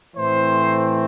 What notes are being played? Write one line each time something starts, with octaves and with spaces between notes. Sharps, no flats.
A2 E3 A3 C4 C5